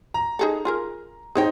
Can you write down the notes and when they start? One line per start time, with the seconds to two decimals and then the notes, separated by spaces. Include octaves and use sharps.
0.14 A#5
0.39 D#4 G#4 A4
0.65 F4 G#4 A#4
1.35 C4 D#4 G#4 C#5 G5